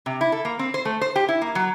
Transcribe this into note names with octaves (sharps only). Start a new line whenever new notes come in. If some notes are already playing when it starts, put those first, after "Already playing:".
C3
E4
A4
A#3
C4
C5
A3
C5
G4
E4
A#3
F#3